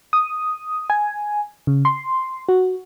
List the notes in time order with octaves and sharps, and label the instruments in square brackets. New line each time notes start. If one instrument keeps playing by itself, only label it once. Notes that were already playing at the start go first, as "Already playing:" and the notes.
[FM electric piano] D#6
G#5
C#3
C6
F#4